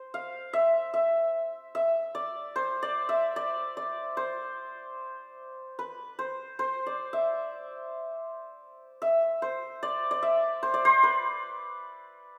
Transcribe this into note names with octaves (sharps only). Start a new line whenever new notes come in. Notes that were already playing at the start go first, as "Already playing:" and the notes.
Already playing: C5
F5
E5
E5
E5
D5
C5
D5
E5
D5
D5
C5
B4
C5
C5
D5
E5
E5
C5
D5
D5
E5
C5
D5
C5
B4